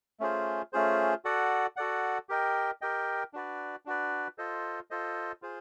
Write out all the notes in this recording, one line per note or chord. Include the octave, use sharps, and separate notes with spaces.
A3 C#4 F4 G#4 C5
A3 C#4 F4 G#4 C5
F#4 A4 D5 F#5
F#4 A4 D5 F#5
G4 A#4 D#5 G5
G4 A#4 D#5 G5
D4 F#4 B4 D5
D4 F#4 B4 D5
F4 A4 C5 D#5
F4 A4 C5 D#5
F4 G#4 C5